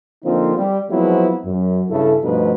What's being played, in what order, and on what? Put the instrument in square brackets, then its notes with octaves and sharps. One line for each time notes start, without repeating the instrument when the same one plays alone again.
[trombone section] D3 F3 A#3 C4 D#4 F4
G3 G4
F3 F#3 G#3 B3 C4 E4
F#2
G2 C#3 E4 A4
G2 B2 F3 A3 D#4 B4